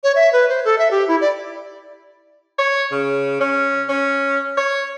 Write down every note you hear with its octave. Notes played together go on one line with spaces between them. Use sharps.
C#5
E5
B4
C5
A4
E5
G4
E4
D5
C#5
C#3
C#4
C#4
C#5